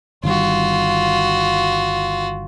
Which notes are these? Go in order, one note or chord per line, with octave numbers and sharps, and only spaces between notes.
G1 D#3 G3 F4 F#4